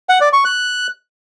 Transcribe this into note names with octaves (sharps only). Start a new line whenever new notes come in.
F#5
D5
C#6
F#6